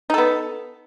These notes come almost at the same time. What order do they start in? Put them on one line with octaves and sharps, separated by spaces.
D#4 A4 B3